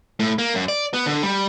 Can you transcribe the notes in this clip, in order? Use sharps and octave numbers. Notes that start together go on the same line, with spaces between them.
A2
A#3
F#2
D5
B3
D3
G3